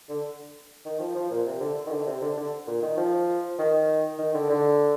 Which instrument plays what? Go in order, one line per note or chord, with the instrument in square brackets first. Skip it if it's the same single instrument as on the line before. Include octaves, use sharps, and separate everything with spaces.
[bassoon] D3
D#3
F3
F3
A#2
C3
D3
D#3
D3
C3
D3
D3
A#2
D#3
F3
D#3
D#3
D3
D3